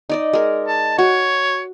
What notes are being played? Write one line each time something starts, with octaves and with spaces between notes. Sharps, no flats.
D#4 D5 D#5
G#3 A#4
A5
F#4 C#5